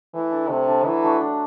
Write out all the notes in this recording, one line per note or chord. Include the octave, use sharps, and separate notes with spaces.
E3 A3
D4 A4
C3 A3
D4 A4
E3 F#3
A3 D4 F#4
D4